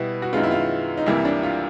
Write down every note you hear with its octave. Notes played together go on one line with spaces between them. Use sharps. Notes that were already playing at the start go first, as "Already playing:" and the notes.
Already playing: B2 G3 B3 E4
F#4
F#2 D#3 G#3 B3 F4
E4
F4
D#4
C2 C3 E3 G3 A#3 E4
D4
F4